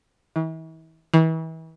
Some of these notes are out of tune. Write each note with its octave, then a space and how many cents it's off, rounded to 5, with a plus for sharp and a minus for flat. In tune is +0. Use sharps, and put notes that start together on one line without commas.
E3 -40
E3 -35